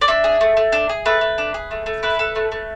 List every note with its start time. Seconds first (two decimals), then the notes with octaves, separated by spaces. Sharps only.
0.01 D5
0.08 D4 E5
0.24 G#4
0.41 A3
0.57 A3
0.72 D4
0.89 G#4
1.06 A3 B4
1.21 A3
1.38 D4
1.54 G#4
1.71 A3
1.86 A3
2.03 E4 B4
2.19 A4
2.36 A3
2.52 A3